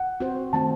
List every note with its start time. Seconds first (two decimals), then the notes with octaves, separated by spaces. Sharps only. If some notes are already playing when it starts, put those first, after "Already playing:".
Already playing: F#5
0.20 C4 F#4 C5
0.53 D#3 A3 C4 A5